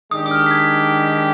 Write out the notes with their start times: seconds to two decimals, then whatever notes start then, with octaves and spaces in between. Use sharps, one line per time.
0.11 D#3 G#3 D4 G4 D#6
0.26 D#6
0.31 F6
0.46 B6
0.51 G#6